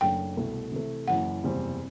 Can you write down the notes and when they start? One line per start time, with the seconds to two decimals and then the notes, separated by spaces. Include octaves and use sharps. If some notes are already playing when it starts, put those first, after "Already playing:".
0.01 F#1 F#2 F#3 A3 D4 G5
0.37 C2 B2 A3
0.72 C3 E3 A3
1.08 F#1 F#2 E3 F#5
1.43 F#1 E2 C3 G3 C4